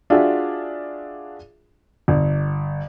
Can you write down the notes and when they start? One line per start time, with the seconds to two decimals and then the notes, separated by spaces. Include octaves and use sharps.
0.10 D4 F4 F#4 G#4 E5
2.08 G1